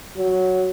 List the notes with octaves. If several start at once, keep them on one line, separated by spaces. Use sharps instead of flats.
F#3